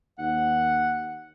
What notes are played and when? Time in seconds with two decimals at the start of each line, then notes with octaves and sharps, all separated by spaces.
0.19 D#2 F#5